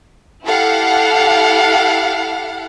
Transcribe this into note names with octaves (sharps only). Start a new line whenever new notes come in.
E4 G4 A4 F5 F#5